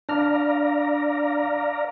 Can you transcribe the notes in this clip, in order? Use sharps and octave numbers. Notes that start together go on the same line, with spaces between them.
D4 D5 F5 A#5 F6